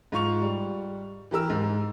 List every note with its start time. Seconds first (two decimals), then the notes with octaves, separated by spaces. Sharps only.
0.12 G#2 F4 C#6 F7
0.42 G3
1.31 E3 G4 A#4 E6
1.50 G#2